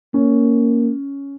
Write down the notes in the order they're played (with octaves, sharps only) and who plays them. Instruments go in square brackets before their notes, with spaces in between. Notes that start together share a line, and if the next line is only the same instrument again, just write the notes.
[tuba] A#3 [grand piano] C#4